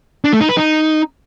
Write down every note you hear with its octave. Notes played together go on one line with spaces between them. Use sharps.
D4
A3
D#4
B4
D#4